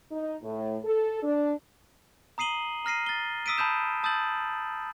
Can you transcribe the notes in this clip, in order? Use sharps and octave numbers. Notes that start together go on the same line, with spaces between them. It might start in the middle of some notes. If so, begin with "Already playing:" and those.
D#4
A2
A4
D4
A#5 D#6 C7 D#7 F#7 G7
A#5 F6 A#6 C7 D#7
A6 G7
D#6 E6 B6 D7 D#7
A5 B5 D#6 G6 E7
A5 D#6 E6 G6 A6 F#7